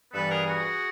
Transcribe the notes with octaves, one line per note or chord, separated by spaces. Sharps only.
G2 E3 G3 B3 A4 B4
G#4 A#4
F#4 G#4